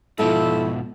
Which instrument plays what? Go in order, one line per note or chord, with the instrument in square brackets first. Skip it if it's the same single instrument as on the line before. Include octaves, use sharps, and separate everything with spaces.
[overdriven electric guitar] G#2 B2 [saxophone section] F3 E4 A4